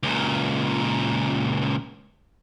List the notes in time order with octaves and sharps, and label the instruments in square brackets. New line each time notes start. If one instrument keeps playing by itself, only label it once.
[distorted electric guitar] C#2 A#2